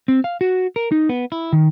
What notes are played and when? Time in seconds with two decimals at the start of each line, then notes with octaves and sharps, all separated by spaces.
0.08 C4
0.24 F5
0.41 F#4
0.76 A#4
0.92 D#4
1.09 B3
1.32 E4
1.53 D#3